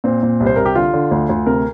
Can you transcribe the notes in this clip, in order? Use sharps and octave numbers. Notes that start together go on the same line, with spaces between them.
A#2 C4
A#2
C2
C5
C2 A#4
G4
D3 F4
D3
D2
D2
C3 A#4